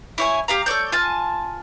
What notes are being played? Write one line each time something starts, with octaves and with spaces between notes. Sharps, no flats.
E4 C#5 G#5
G4 F5 A#5
A4 C#5 D5 G6
F4 G#5 A5